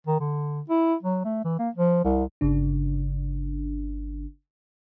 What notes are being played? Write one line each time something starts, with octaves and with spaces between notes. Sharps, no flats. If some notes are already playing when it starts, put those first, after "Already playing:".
D#3
D3
E4
F#3
A3
E3
A#3
F3
C2
G1 C#3 D4